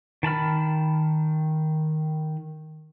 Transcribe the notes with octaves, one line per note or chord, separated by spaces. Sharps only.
D#3 A5 B5 F6